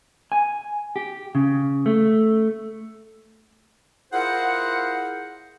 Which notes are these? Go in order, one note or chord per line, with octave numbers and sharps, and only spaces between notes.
G#5
G4
C#3
A3
E4 F4 G#4 A#4 C5 F#5